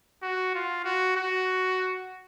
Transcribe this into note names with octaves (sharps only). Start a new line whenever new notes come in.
F#4
F4
F#4
F#4